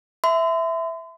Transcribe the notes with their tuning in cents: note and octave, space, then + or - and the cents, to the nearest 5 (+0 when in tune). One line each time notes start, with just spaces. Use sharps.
E5 +0 C6 -40